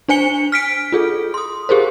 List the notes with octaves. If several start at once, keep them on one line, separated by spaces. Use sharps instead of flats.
D4 C5 G#5 C#7 G7
F6 B6 D7
F4 G#4 A4
C6 D#6
G4 G#4 A#4 C5